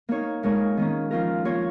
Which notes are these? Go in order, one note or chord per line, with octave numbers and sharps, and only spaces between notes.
A#3 D#4 C#5
A#2 G#3 D#4 A#4 C#5
D#3 A#3 C#4
F3 C#4 F4 A#4
A#3 F4 A#4 C#5